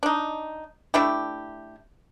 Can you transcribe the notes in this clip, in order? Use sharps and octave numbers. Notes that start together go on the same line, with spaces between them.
D4 D#4
A3 D4 E4 G4